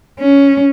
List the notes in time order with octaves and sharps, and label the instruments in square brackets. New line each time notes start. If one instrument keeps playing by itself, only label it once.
[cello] C#4